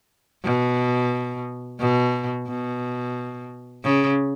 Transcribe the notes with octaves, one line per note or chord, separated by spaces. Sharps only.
B2
B2
B2
C#3